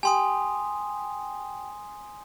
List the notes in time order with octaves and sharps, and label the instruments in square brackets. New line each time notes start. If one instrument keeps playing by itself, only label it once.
[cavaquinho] G4 [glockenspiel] G#5 C6 D#6